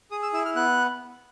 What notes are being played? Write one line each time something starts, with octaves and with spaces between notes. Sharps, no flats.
G#4 D#6
E6
E4 E6
F6
B3 F#6